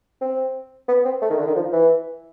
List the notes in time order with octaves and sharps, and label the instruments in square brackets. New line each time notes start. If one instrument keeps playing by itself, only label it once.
[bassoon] C4
B3
C4
A3
D#3
D3
D#3
F3
E3